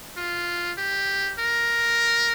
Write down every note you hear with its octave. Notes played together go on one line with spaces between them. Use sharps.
F4
G4
A#4